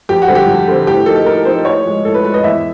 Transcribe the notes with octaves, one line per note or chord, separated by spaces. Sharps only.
F2 G4
F#4
D3 G3 C4
G4
F2
D3 G3 C4
A2 G4
F3 A#3 D#4 A4
A2 A#4
F3 A#3 D#4 C5
A2 C#5
F3 G#3
A2 A4
B4
F3 G#3 B4
D#5
E2 E5